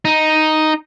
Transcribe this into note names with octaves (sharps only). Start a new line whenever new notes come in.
D#4